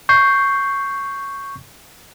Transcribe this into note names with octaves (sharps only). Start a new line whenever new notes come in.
C#6 G6 C7